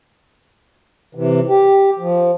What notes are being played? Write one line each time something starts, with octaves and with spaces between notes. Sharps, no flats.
C3 E3
G4
F3